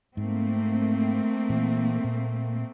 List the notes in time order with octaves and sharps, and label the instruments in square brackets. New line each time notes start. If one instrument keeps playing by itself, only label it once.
[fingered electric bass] G#2 [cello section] A3 A#3 C4
[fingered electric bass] A#2 E3
A#2